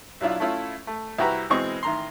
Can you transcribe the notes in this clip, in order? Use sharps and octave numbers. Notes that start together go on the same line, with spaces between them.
B1 F#3 D4 E4 F4
A3 C#4 E4 F4
A3
C2 E4 F#4 G4 B4 A#5
B2 E3 G#3 C4 D#5 C#6
A1 D#3 A#5 C6